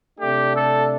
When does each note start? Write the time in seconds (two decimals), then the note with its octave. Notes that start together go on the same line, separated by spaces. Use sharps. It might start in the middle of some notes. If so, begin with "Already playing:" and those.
0.19 C3 A3 D4 G4
0.53 A4